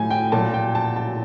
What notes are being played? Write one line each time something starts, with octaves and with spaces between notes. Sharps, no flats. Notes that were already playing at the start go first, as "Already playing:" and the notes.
Already playing: A2 F#3 G#5
G5
A#2 F#3 A5
G5
A5
A5